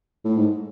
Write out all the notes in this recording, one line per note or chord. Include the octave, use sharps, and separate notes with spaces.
A2
G#2